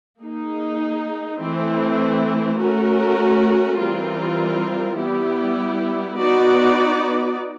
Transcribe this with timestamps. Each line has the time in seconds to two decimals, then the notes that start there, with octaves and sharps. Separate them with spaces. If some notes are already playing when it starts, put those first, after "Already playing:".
0.20 A#3 D#4 G#4
1.39 E3 A3 C4 E4
2.59 A3 C#4 F#4 A#4
3.78 E3 G3 C4 F4 A#4
4.98 G3 B3 E4 G4
6.17 B3 D#4 F#4 B4 D5